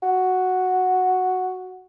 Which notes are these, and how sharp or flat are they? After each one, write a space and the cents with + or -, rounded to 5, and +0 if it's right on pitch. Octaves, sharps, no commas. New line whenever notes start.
F#4 +0